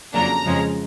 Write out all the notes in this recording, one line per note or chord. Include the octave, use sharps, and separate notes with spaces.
F2 C#3 F#3 A#3 D4 A#5
F2 C#3 F3 G#3 C#4